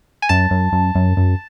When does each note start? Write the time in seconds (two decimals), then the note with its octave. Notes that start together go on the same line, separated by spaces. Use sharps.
0.22 G#5
0.29 F#2 A5
0.51 F#2
0.72 F#2
0.95 F#2
1.17 F#2